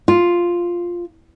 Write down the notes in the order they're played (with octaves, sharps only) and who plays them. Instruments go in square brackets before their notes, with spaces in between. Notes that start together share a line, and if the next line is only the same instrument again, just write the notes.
[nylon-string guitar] F4